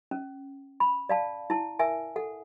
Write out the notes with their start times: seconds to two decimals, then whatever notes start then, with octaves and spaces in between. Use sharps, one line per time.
0.11 C#4
0.80 B5
1.09 D5 F5 A5
1.50 E4 A5
1.79 A#4 E5 G#5
2.16 A4 F#5